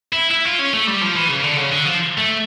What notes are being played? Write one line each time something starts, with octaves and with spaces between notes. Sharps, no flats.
E4
E4
F4
C#4
A3
G3
F3
E3
C#3
D3
C#3
D3
F3
A3